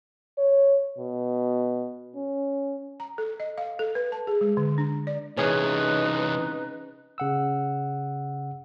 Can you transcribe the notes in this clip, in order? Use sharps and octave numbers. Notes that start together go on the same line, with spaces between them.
C#5
B2
C#4
A#5
A4
D#5
F5
A4
B4
A5
G#4
G#3
D3
D4
D5
C3 E3 C#4 D#4 G#4 B4
C#3 F#5 E6